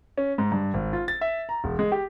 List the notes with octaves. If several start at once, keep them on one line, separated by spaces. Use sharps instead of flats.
C#4
G#2
G2
G#1
F4
A6
E5
A#5
E1
G#3
G4